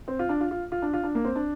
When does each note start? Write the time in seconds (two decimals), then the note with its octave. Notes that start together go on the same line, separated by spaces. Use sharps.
0.08 C4
0.19 F4
0.29 D4
0.41 F4
0.51 F4
0.72 F4
0.82 D4
0.93 F4
1.03 D4
1.15 A#3
1.25 C4
1.36 D4